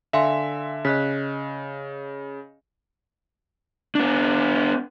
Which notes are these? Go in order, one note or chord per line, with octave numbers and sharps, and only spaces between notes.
D3 E5 F5 G#5 C6
C#3 D#5 F#6 B6
B3 D4